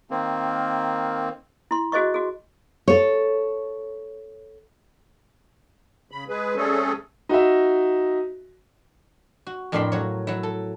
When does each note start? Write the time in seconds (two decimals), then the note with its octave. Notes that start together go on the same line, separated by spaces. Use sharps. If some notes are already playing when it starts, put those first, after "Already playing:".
0.10 D#3 A#3 C4
1.71 E4 C6
1.92 F#4 G#4 C5 D#5 C#6
2.14 F#4 G#4
2.88 A4 C#5
6.11 C#3 B5
6.29 G#3 G#4 B4
6.56 G3 A3 C4 C#4 G#4 A4
7.29 D#4 F#4 D#5 E5
9.47 F#4
9.72 F2 A2 D4 A#4 B5 C6
9.92 F#3 C#5
10.27 F#3 E4
10.43 A4